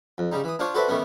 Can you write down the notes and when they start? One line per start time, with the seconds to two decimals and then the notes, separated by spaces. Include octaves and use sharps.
0.18 F2
0.32 C#3 G3 D#4
0.44 E3 D#6
0.59 D4 F4 C5 C#5 F5
0.74 F#4 A4 B4 C5 D5 E5
0.88 D#3 G3 A3 B3 C#4